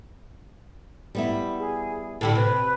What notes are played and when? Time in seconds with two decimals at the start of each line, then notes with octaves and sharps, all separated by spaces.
1.15 G3 B3 E4
1.58 G#4
2.21 A2 D3 G3 G5
2.35 C3 B4